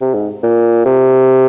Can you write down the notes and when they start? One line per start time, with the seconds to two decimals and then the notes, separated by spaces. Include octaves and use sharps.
0.01 C3
0.15 G#2
0.43 A#2
0.85 C3